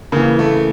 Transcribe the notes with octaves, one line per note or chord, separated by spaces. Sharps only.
C#3 E3 A#3
A3